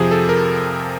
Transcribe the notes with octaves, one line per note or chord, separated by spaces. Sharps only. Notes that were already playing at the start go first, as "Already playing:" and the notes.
Already playing: F2 C3 F3 G#4
A4
A#4